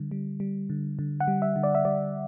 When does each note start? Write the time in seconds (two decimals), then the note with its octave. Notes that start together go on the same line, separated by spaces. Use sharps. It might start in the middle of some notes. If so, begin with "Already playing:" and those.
Already playing: D3 G3
0.11 G3
0.40 G3
0.70 D3
0.99 D3
1.20 F#5
1.28 G3
1.42 E5
1.56 D3
1.64 D5
1.75 E5
1.85 G3 D5